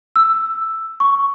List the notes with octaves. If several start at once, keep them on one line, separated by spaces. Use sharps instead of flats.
E6
C#6